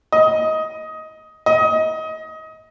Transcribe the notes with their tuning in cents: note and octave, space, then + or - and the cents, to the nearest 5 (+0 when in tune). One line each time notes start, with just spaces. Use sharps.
D#5 +15
D#5 +25